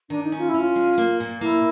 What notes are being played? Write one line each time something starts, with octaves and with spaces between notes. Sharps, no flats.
D#3 D4
D#4
C#4
F4
E4
C#4
F4
G#3
A#3
A#2
A#3 E4